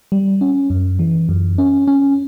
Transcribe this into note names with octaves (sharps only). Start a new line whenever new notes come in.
G3
C#4
F#2
E3
F#2
C#4
C#4